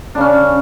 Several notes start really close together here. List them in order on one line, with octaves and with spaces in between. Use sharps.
D4 C#3 C#4